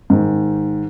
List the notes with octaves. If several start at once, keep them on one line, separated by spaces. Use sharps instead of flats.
G#2 D#3